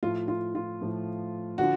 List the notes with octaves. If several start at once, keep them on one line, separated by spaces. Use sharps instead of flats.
A2 F3 F4
F4
F4
A2 F3
D3 F3 F#4